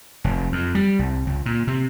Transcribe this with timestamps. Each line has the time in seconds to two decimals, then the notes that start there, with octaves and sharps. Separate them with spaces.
0.24 F1
0.52 F2
0.75 G3
0.99 C2
1.27 C#2
1.46 A#2
1.67 C3